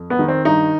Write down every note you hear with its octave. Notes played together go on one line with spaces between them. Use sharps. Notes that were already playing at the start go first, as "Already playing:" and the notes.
Already playing: F2
B3
D#3
C4
G2 D#4